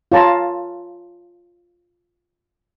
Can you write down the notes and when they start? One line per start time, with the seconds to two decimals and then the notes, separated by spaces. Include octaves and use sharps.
0.12 F4 C#5 A5 A#5